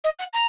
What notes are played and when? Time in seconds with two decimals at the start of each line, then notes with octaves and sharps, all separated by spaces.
0.04 D#5
0.19 F#5
0.33 A#5